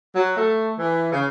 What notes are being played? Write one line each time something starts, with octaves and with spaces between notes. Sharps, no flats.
F#3
A3
E3
C#3